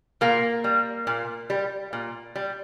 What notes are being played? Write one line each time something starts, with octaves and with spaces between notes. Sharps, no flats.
A#2 A#3
G3
A#2
G3
A#2
G3